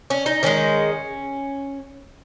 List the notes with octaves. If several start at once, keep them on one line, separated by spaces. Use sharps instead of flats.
C#4
D#4
D#3 G#3 C#4